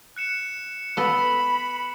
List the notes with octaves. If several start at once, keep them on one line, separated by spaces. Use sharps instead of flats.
F#6 C#7 E7
B3 A4 B5